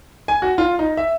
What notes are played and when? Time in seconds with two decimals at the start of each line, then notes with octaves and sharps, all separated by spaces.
0.28 G#5
0.42 F#4
0.58 F4
0.79 D#4
0.97 E5